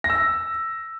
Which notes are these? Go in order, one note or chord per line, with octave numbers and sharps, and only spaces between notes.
A#6
E6
A#6